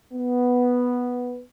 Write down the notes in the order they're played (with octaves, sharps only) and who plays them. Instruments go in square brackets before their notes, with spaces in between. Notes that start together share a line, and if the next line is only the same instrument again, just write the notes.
[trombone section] B3